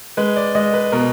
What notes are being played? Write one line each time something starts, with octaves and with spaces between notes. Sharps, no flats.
G#3 B4
D5
G#3 D#5
B4
B2 A#4